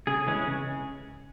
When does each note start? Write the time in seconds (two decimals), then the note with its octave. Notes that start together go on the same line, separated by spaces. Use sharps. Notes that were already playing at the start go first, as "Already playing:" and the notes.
0.07 C#3 G#4
0.27 E3 G#3 C#4
0.47 C#3